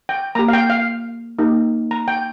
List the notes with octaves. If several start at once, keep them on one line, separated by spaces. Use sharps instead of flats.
G5
A#3 G4 A#5
F5
G5
F5
A#3 D#4 G4
A#5
G5